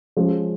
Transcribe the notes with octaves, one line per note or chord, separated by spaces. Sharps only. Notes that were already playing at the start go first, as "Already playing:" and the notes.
F3 G#3 C#4